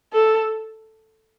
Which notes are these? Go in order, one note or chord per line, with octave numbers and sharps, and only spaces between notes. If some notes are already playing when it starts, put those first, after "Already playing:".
A4